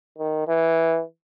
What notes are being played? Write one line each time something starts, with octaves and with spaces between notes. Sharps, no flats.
D#3
E3